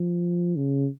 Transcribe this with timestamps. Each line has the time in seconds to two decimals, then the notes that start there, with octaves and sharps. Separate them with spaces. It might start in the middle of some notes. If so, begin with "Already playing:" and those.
Already playing: F3
0.56 C#3